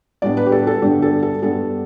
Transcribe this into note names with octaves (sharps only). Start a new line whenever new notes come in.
A2 G3 B3 D4 D5
B4
G4
A4
A4
G2 D3 G3 B3 D4 G4
A4
A4
G2 G3 B3 D4 A4